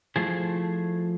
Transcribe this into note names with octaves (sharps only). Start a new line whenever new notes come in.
F3 A3 E4 G#4 C5